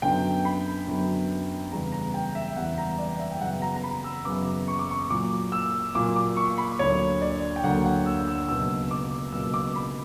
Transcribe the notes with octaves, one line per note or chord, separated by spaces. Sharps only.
F#2 D3 F#3 B3 G5
B5
F#2 D3 F#3 B3
E2 C#3 G3 B3 A#5
A#5
G5
E5
E2 C#3 G3 B3 F#5
A#5
D5
E5
G5
F#2 C#3 F#3 B3 F#5
A#5
A#5
B5
E6
F#2 C#3 F#3 B3 D6
C#6
D6
C#6
A#2 F#3 A#3 D6
E6
A#2 F#3 A#3 D6
D6
C#6
B5
D2 D3 F#3 A#3 C#5
D5
G5
D2 D3 F#3 A#3 F#5
F#5
E6
E6
C#2 B2 F#3 A#3 E6
D6
C#2 B2 F#3 A#3 E6
D6
B5